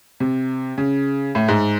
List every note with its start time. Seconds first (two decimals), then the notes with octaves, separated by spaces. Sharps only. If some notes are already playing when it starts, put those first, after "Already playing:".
0.20 C3
0.78 C#3
1.35 A2
1.48 G#2